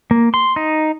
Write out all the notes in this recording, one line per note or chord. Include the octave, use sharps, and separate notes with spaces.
A#3
C6
D#4